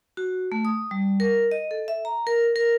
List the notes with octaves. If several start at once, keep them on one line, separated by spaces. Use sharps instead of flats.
F#4
A3
D#6
G3
A#4
D#5
A4
E5
A#5
A#4
A#4